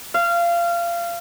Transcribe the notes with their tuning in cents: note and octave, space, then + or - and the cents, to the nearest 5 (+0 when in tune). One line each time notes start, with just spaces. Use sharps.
F5 -25